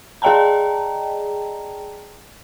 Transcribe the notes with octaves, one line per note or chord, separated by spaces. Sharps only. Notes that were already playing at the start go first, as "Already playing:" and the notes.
G#4 D5 D#5 G5 A5 A#5